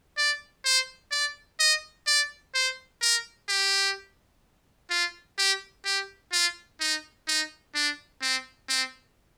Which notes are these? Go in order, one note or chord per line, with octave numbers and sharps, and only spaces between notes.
D5
C5
D5
D#5
D5
C5
A#4
G4
F4
G4
G4
F4
D#4
D#4
D4
C4
C4